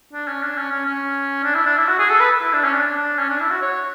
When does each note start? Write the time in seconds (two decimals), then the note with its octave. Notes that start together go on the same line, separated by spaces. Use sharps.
0.13 D4
0.28 C#4
0.43 D4
0.57 C#4
0.72 C#4
0.86 C#4
1.44 D4
1.55 E4
1.66 D4
1.78 E4
1.88 F#4
1.99 G#4
2.10 A4
2.20 B4
2.43 E4
2.53 D4
2.64 C#4
2.75 D4
2.97 D4
3.19 C#4
3.29 D4
3.40 E4
3.51 F#4
3.62 C#5